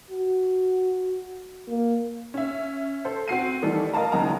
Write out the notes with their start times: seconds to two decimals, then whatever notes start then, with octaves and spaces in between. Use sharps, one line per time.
0.10 F#4
1.68 A#3
2.34 C#4 E5
3.05 A4 C5
3.28 C4 F#4 C7 D#7
3.62 D#3 E3 G3 A3 A4
3.93 A#4 D#5 F5 A5 A#5
4.12 F#1 C#2 F#2 D#4 A#5